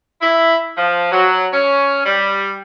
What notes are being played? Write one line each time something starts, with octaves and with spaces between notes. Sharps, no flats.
E4
F3
F#3
C#4
G3